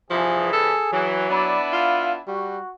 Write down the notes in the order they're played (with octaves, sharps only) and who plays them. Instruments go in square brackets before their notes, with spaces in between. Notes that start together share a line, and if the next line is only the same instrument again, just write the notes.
[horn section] G2 C3 E3 [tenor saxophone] F3 [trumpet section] G#4
[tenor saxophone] A4
[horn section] E3 [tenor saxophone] F#3
[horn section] B3 D4 E4 [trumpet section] D5 B5
[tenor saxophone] F4 [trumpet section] F5
[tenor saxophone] G3 [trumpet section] F#4